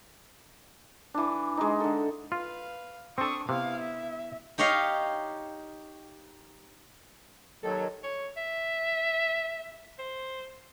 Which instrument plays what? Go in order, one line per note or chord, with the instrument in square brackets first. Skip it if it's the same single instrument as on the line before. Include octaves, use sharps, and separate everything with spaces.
[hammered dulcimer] E3 D4
G#3 D#4
D3 A4
[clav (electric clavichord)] F4 [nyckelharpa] B4 F5
[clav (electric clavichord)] C4 A4 [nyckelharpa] D4 D#6 [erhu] C#6
[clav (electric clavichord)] C3 [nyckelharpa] B3 E4 [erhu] F5
[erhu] E5
[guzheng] D#4 G4 C#5 D#5 F5
[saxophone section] D#2 A4 [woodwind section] D#3 F#3
[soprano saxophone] C#5
E5
C5